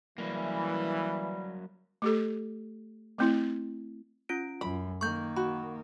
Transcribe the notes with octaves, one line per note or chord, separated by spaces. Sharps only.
E3 F#3 G3 A#3
A3 G4 A4
A3 C4 E4
C#4 F4 D7
F#2 B5
D#3 A#3 C#6 G6
F#4 B5